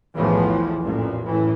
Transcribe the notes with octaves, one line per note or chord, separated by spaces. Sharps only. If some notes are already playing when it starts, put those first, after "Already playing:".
B1 E2 A2 E3 F3
A1 F2 A#2
F#2 A2 E3